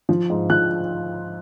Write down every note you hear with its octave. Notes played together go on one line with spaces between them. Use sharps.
F3
G#2
F3 F#6